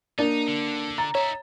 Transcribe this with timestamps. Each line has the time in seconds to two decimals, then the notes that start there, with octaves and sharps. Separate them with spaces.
0.19 A#3 D4 D#4 D5
0.48 D3
0.98 A#5 A6
1.15 D#4 C#5 E5